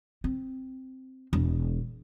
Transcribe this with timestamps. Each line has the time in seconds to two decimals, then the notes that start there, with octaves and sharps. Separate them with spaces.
0.24 C4
1.33 E1